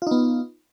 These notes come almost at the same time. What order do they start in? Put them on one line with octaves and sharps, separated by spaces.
F4 D#4 B3